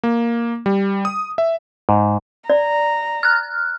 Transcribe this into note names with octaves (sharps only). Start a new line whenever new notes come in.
A#3
G3
D#6
E5
G#2
D5 A#5
F6 F#6